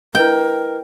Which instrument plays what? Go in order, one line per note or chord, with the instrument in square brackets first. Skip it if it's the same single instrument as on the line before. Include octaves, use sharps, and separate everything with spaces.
[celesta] E4 B4 D#5 [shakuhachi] A#4 [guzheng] G5